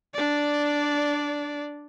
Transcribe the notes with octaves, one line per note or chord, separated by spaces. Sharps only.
D4 D5